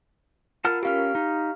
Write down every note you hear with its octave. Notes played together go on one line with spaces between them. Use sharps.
F4 A#4 F#5 A5 F6
C#4 G4 A#4 F5 F6
D#4